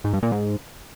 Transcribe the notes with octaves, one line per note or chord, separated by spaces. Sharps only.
G#2
G2
A#2
G#2